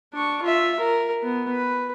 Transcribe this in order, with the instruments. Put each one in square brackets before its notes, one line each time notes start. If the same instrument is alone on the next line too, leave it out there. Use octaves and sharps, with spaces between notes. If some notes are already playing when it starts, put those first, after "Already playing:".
[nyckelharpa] D4 C#6
F4 E5
A#4
B3
B4